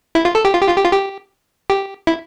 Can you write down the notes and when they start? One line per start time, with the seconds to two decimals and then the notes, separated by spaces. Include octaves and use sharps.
0.15 E4
0.25 F4
0.35 A4
0.45 G4
0.53 F4
0.61 G4
0.68 F4
0.76 G4
0.84 F4
0.92 G4
1.70 G4
2.07 E4